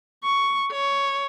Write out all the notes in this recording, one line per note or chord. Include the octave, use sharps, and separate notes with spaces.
C#6
C#5